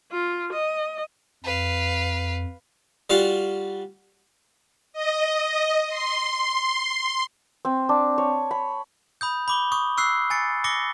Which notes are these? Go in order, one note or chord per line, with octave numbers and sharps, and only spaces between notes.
F4
D#5
F2 B4 F5
G3 F4 F#4 F5
D#5
C6
C4
D4
C#5
B5
B5 D#6 G6
B5 D6 G7
C#6 D#6
C#6 E6 F#6 C7
G#5 A6 C#7
D6 A#6 C#7 G7